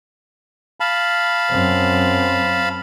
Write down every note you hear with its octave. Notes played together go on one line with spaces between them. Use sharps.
F5 A5 B5
F#2 C4